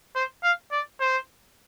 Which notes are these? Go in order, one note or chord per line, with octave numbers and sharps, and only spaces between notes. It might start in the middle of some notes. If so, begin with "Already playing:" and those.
C5
F5
D5
C5